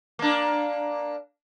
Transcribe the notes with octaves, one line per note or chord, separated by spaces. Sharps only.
A#3 D4